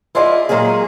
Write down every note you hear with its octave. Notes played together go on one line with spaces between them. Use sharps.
E4 F4 G#4 D5 D#5
A#2 F#3 G#3 A#3 G#4